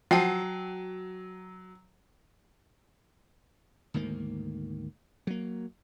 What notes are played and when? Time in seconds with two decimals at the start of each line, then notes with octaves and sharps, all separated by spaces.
0.11 F3 F#3 F#5 G5 A5
3.94 D2 G#2 D#3 A#3
5.27 F#3 A#3